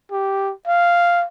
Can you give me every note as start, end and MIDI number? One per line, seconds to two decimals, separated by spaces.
0.11 0.53 67
0.67 1.26 77